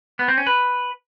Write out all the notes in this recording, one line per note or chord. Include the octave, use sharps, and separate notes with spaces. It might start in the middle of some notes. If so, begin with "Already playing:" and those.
B3
C4
C#4
B4